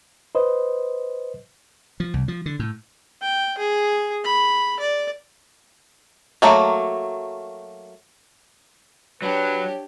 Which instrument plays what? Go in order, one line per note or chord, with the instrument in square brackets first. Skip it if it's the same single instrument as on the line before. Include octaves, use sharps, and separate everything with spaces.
[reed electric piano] B4 C5 D#5
[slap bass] F3
C2
F3
D3
A2
[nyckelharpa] G5
G#4
B5
D5
[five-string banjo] F#3 A3 A#3
[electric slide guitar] F#3 [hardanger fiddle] D4 G4 [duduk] B4 [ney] C#5